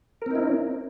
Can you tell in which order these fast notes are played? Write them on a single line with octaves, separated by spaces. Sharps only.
A#4 C4 D#4 E4 C#4